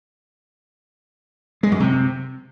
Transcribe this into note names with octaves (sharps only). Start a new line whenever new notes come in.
G#3
F#2
C3